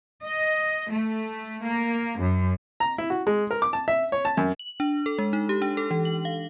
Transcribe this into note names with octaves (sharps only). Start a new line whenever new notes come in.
D#5
A3
A#3
F#2
A#5
E4
F#4
G#3
A#4
D6
A5
E5
C#5
A5
F#2
F#7
D4
A4
G#3
D#4
G4
D4
A4
E3
F#7
F5